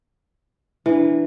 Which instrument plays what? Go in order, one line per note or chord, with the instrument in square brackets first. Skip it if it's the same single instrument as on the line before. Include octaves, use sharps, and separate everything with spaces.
[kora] E3 [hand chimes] D4 E4